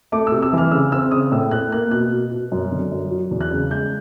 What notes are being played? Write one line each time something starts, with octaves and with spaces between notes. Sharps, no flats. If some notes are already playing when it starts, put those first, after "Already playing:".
A3 D6
E6
C3
E6
E3 F6
C#3 E6
C4 E6
C#3 D#6
A2 E6
A2 F#6
A#3 F#6
B2 F#6
B2
B2
F#2
D3
F#2
F#3
E2
F#6
C#3
G#3 G6